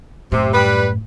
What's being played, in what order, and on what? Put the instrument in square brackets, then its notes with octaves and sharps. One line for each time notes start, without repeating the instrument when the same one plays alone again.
[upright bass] F#2 A2 [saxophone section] C3
[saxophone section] G3 B4